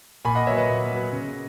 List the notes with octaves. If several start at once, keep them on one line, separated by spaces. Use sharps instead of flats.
A#2 G#5 B5
D#5 F#5
F#3 B3 C#5 E5
B4 D#5
A#2
F#3 B3
C#3